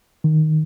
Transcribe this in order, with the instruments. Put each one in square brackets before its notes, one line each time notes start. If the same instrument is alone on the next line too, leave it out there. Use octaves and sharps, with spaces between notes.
[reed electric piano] D#3